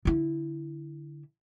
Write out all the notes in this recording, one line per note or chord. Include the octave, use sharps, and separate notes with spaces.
D3 E4